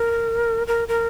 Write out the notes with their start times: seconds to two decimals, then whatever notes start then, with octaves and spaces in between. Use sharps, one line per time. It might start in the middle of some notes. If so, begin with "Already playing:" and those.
Already playing: A#4
0.67 A#4
0.88 A#4